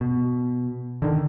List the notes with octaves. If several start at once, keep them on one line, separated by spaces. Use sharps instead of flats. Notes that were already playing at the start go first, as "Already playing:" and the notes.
B2
D3 D#3